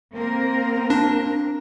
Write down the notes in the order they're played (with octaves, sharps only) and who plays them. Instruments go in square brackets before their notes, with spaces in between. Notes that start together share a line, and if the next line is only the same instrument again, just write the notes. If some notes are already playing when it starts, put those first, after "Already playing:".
[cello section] A#3 C4 A#4
[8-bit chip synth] D4